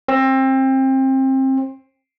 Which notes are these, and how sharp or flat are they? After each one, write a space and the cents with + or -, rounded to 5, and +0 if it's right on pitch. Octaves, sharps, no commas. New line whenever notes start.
C4 +25